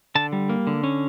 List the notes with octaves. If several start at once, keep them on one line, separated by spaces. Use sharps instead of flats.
D3 A5
G3
A#3
D3
C#4